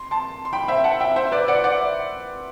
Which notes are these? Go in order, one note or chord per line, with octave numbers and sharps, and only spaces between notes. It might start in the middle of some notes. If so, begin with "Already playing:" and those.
Already playing: C6
A5 C6
C6
G5 B5
C5 E5
G5
F#5 A5
E5 G5
C5 E5
B4 D5
D5 F#5
D5 F#5